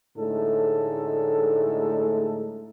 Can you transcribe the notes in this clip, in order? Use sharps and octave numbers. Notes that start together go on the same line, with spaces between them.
A2 D3 G#3 A3 D#4 A4